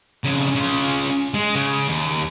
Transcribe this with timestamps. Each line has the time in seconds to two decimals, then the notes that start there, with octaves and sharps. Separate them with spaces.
0.24 F2 C#3
0.55 C#3 F4
1.34 G#3
1.55 C#3
1.88 D#2